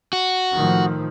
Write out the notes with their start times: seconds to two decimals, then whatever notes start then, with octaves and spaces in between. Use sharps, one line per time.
0.13 F#4
0.54 A2 D#3 F3